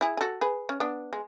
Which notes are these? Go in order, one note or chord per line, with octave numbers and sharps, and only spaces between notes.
E4 G#4
G#4
F#4 A4
G#4 B4
C#4
B3 D4
G#3